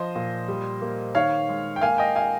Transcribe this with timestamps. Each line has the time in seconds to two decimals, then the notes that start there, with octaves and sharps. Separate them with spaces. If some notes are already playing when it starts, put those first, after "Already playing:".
Already playing: F3 C5 D#5
0.15 A#2
0.48 G3
0.82 A#3
1.15 D#3 C#5 F5
1.49 G#3
1.76 G5
1.81 A#3 F5 G#5
1.98 D#5 G5
2.16 F5 G#5